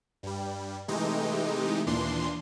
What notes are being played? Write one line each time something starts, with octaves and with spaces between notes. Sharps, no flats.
G2 G3
C3 E3 G#3 A3 D#4 G4
D#2 A#2 E3 D4 C6